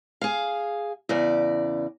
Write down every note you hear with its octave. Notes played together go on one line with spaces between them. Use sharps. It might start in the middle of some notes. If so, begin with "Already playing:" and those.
G#4 F5
E2 C#3 D5